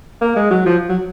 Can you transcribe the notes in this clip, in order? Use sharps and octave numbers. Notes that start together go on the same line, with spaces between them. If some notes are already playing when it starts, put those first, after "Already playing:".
A#3
G#3
F#3
F3
F#3